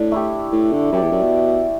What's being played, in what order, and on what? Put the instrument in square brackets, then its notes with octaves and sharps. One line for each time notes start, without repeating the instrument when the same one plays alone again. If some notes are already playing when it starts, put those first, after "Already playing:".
Already playing: [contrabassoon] A2 [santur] D4
[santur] A3 E4 G4
[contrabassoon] A2
D3
[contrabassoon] F#2 [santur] E4 G4 D5
[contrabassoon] E2
F#2
B2